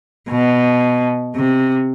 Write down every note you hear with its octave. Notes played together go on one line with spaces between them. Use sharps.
B2
C3